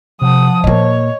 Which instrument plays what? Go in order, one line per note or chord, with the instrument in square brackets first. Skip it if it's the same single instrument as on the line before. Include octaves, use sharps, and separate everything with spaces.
[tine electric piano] C3 [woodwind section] F3 [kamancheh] F#5 D#6
[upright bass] A#2 A#3 [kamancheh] C#5 [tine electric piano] D#5